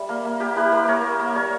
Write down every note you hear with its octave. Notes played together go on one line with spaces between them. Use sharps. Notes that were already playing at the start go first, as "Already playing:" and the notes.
Already playing: G3 E5
A#3
A#3
A#3 G4
E4 G4 B4
A#3 G4 B4
A#3 A#4 C#5
A#3
A#3
G3 A#4 C#5